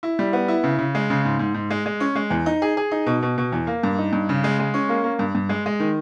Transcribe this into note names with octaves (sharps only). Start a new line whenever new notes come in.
E4
G3
B3
E4
C#3
C#3
G#3
C#3
G#2
G#2
G#2
G#3
G#3
C#4
G#3
E2
D#4
G#4
G#4
D#4
B2
B2
B2
E2
A#3
G2
D#4
G2
C#3
G#3
G#3
C#4
A#3
A#3
G2
G2
G#3
G#3
D#3